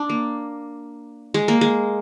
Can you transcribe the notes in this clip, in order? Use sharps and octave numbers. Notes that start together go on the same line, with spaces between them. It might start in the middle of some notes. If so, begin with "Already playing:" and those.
Already playing: D4
A#3
G#3
A#3
G#3